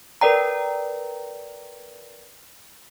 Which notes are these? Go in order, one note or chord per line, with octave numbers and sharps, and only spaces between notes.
A#4 B4 D5 G5 A#5